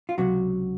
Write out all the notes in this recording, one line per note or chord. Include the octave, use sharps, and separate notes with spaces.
F4
C#2 C3 F#3 F#4